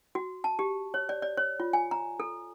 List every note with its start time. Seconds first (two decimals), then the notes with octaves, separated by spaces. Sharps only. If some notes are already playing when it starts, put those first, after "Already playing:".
0.15 F#4
0.44 A5
0.59 G4
0.94 C#5
1.09 D5
1.22 D5
1.37 C#5
1.60 F4
1.73 G#5
1.91 A#5
2.20 A4